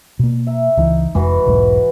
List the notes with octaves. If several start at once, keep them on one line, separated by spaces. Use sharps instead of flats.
B2 A#3
E5 A#5
C#2 E3 D#4
F1 F2 E3 G#3 F#4
E1 B1 G#2